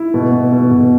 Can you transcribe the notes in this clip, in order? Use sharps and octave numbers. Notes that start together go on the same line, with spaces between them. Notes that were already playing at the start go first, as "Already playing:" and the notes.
Already playing: E4
B2
B2
B2
B2